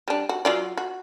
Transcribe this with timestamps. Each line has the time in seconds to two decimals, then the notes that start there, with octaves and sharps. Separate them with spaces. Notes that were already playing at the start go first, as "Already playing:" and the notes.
0.08 G3 D4
0.29 F#4
0.45 F#3 F4 D5
0.78 F#4